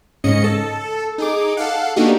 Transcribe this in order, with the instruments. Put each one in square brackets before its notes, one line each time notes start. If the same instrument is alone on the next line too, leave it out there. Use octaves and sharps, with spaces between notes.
[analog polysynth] G#2 C#3 C#4 D#5 C#7
A4
D#4 G#4 D6
A4 F5 F#5
A#3 B3 D4 D#4 F#4 G4